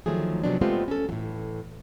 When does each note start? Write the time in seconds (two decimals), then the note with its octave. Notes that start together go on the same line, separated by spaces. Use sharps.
0.06 D2 D#3 F3 F#3 A3 G#4
0.44 C3 F3 F#3 G#3 B3 D4
0.61 G#3 A3 B3 C4 F4 G4
0.88 C#4 A4
1.09 A2 E3 F#3